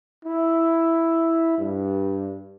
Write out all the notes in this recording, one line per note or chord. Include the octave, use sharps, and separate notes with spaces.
E4
G2